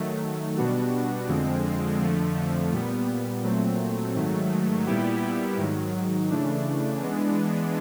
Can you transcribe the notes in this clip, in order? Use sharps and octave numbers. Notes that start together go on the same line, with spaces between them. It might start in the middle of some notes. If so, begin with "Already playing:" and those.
Already playing: D#3 F#3 A3
B2 G3 B3 D4 F#4
F2 D3 F3 G#3 C4
F2 D3 F3 A3
A#2 G3 B3
A#2 F#3 A3 C4
G#2 D#3 F#3 A3
A#2 G3 B3 E4 G4
G#2 D#3 F#3
C#3 E3 A3 D4
E3 G#3 B3 D4